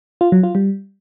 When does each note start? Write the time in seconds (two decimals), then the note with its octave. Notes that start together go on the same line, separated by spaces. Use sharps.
0.21 F4
0.32 F#3
0.43 F4
0.55 G3